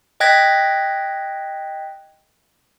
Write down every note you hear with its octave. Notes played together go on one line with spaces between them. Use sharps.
D#5 G5 F#6 G#6 A#6 B6